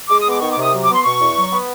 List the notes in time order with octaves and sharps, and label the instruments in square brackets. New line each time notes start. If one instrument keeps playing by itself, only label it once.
[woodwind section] G#3 D6
B3 D#6
D6
D#3 C#6
D6
C3
D#6
F#3
D6
B3
C6
B2 C#6
E2
F#3
B3